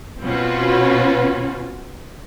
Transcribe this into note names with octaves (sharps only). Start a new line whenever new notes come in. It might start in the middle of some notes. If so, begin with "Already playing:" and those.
B2 C4 C#4 F4 F#4 B4